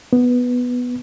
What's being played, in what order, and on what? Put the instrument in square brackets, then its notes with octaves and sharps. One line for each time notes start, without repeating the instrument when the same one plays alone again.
[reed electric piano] B3